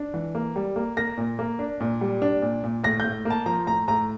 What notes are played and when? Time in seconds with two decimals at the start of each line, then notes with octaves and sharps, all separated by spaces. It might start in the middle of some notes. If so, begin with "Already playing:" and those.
Already playing: D4
0.14 E3
0.35 A#3
0.56 G3
0.76 A#3
0.97 A#3 A#6
1.18 A#2
1.39 A#3
1.59 D4
1.80 A#2
2.01 G3
2.22 D4
2.42 A#2
2.64 A#2
2.84 A2 A#6
3.00 A2 G6
3.25 A#3
3.30 A5
3.46 F3 A#5
3.67 A2 A#5
3.88 A2 A#5